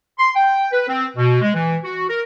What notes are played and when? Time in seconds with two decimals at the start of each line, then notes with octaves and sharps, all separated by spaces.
0.18 C6
0.36 G5
0.72 B4
0.88 C4
1.17 B2
1.42 G#3
1.54 E3
1.84 F#4
2.09 A#4